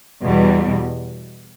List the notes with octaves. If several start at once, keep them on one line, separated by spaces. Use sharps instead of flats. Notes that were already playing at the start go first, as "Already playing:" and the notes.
E2 B2 G3